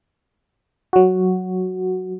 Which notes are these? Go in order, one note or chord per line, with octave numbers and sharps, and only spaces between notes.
F#3 F#4